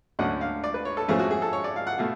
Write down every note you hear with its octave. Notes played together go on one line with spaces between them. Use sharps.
D2 D3 F#3 C#4 F#5
F5
D5
B4
C#5
A4
F2 F3 A3 C#4 G#4
F#4
G#4
A4
C#5
D5
F5
F#5
B2 A3 F5